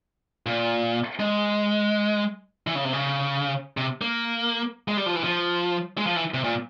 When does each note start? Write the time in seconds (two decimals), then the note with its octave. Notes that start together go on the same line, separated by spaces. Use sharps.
0.46 A#2
1.20 G#3
2.67 E3
2.75 C#3
2.85 C3
2.93 C#3
3.77 C3
4.01 A#3
4.88 G#3
4.97 G3
5.06 F3
5.15 E3
5.24 F3
5.98 G#3
6.06 F3
6.16 E3
6.34 C3
6.44 A#2